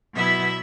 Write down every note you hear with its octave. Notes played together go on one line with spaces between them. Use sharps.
B2 F#3 B3 E4 E5